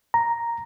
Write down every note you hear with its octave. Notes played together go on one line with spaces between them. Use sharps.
A#5